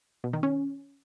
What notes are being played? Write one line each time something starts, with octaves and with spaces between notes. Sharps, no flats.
B2
D#3
C#4